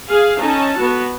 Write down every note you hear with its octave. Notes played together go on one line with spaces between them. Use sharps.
G#4 F5
C#4 D#4 A4 A5
B3 F#4